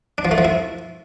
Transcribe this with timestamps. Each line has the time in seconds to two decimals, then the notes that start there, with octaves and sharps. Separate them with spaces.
0.18 D4
0.25 F3
0.31 A3
0.38 F3
0.45 E4